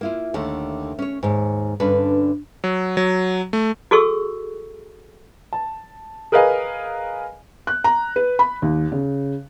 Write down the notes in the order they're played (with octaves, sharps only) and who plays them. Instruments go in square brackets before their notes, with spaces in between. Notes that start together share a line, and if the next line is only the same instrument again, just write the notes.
[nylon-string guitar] A#3 E4 F4
D#2 D3 A3
C#4 C#5
D#2 G#2
G2 D3 C#4 D4 B4
[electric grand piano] F#3
F#3
A3
[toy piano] F#4 G#4 A4 C#6 E6
[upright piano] A5
G#4 A#4 B4 D#5 F5 G#5
[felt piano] F#6
A#5
B4
B5
D#2
C#3